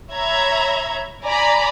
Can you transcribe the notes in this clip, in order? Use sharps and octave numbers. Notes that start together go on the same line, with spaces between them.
C#5 E5 A#5 B5 G#6
D5 G#5 A#5 B5